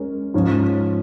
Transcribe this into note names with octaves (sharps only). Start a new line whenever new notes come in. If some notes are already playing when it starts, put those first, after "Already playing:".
Already playing: G#3 C#4 A#4
G#2 F3 C#4